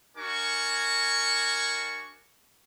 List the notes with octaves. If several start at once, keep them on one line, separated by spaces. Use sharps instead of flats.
D4 F#4 A#4 G#5 C#6